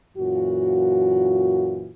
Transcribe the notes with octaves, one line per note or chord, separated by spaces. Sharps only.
F#2 A#2 E3 F4 F#4